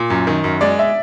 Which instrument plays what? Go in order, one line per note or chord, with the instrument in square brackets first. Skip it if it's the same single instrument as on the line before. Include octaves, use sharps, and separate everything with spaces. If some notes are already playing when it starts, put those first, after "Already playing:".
Already playing: [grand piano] A#2
F#2
D#3
F#2
[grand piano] G#3 [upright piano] D5
[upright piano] E5